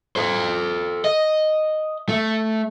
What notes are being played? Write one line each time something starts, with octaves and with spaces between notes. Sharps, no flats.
A4 C5
D#5
A3